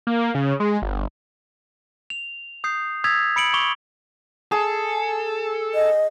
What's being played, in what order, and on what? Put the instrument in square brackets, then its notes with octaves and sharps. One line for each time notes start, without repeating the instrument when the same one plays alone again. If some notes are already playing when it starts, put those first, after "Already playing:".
[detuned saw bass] A#3
C#3
G#3
G1
[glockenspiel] F7
D#6 G6 C7
D#6 E6 G#6 A6 B6 F7
B5 C#7 D7 F#7
C#6 D6 F7 G7
[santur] G#4 [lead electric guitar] A4
[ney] D#5